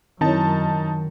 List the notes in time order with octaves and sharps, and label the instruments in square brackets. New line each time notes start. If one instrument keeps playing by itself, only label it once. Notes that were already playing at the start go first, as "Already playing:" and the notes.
[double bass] F#2 [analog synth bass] D#3 [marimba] C4 E4 C#5 [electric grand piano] D#4 A5